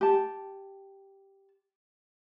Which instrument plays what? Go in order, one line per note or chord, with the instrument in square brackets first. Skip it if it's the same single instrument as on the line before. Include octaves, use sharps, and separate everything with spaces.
[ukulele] G4 A5